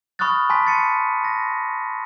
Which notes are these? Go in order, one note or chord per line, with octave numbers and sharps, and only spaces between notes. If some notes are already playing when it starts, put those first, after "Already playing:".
B5 C#6 D#6 F6 F#6 A6
G#5 A5 B5 C6 B6
A6 C#7 D#7
A#6